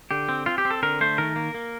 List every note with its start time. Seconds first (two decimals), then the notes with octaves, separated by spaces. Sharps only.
0.11 D3 G4
0.29 C4
0.46 C4 F4
0.58 G4
0.65 C4
0.71 A4
0.83 D3 A#4
1.01 A3 C5
1.18 D#3 A#4
1.36 A#3
1.55 A#3